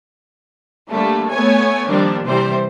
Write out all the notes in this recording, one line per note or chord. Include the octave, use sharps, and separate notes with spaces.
D3 G3 A3 A#3
A3 B3 C#5 G#5
D#3 F3 G3 A#3 C4 D4
C3 E3 G3 C4 C5